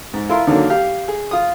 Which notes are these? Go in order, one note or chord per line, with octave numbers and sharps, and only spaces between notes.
G#2
E4 F4 A#4 C6
D3 D#3 F#3 A#3
G4 F5
G#4
F4 D#6